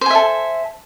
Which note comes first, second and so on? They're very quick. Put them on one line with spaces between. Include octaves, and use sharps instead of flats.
C5 G#5 E5 A4